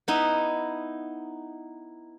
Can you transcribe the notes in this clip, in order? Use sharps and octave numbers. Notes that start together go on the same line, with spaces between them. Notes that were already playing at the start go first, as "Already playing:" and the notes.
B3 D#4 E4